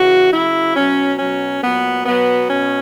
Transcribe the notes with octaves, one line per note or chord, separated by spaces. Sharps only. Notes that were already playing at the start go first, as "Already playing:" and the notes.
Already playing: C#3 E3 F#4
C#3 F#3 E4
B2 F#3 C#4
B2 F#3 C#4
A#2 F#3 B3
B2 F#3 B3
B2 C#4